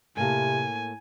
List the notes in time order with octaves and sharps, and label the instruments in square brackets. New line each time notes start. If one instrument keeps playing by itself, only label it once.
[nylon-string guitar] A2 A#3 A5 [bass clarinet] C3 [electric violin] G#5